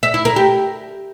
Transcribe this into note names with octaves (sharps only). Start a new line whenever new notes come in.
E5
E4
A#4
G4